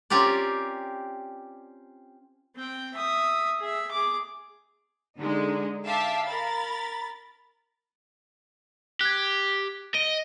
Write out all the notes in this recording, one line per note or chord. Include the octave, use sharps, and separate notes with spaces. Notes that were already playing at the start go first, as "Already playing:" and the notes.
C4 C#4 F4 G4 A#4 D5
C4 G5
E5 D#6
G#4 E5
G#4 D6
D3 G#3 D#4
E5 F5 G5 A5 D6
A#4 B5 A6
G4 F#6 G#6
D#5 D7 D#7 G7